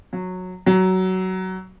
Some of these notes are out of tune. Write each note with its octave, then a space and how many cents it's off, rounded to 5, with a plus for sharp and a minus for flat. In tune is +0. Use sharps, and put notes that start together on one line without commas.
F#3 -15
F#3 +15